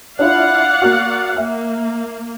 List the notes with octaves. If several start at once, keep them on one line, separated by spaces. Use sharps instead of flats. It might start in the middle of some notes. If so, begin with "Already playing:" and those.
D4 E4 F4 D5 F5 F#5
A#3 F#4
A#3 E5